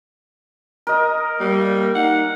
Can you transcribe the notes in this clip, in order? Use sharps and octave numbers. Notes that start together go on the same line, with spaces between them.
A#4 D#5
G3 A#3
D#4 F#5